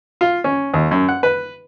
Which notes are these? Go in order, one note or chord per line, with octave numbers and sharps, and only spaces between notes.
F4
C#4
D#2
F#2
F#5
B4